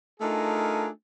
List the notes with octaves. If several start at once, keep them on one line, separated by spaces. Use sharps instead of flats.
A3 D4 D#4 F4 G#4 A#4